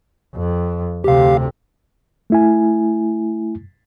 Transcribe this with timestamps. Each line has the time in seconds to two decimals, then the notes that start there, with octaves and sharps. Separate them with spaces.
0.35 F2
1.04 D2 C3 G4 F5
2.30 A3 E4 G#5